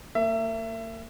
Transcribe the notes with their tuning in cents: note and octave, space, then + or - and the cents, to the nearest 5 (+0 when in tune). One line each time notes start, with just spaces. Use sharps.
A#3 -40 E5 +25